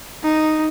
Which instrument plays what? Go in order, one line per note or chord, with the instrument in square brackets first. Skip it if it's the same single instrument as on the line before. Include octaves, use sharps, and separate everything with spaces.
[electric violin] D#4